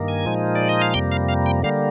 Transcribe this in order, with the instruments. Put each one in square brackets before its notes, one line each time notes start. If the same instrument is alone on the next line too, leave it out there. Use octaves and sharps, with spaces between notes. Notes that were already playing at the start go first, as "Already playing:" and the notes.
Already playing: [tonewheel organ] G2 D#3 A#3
G#5
A#2 F3 G#3 D#4
D5
D#5
F5
F2 C3 G3 A#3 G5
F5
F5
G5
D3 G3 A#3 F5